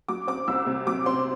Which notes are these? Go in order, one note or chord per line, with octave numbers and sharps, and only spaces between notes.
F#3 D6
C4 D6
C2 E6
C3
F#3 D6
C4 C6